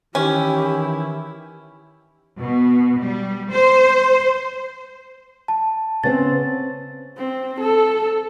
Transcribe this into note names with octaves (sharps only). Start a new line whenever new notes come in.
D#3 E3 C#4 E4 G4
B2
G3
C5
A5
C#3 B3 C4 A6
C4
A4